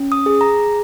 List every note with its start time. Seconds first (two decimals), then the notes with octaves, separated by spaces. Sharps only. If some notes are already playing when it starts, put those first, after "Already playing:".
Already playing: C#4
0.12 D#6
0.26 G#4
0.41 A#5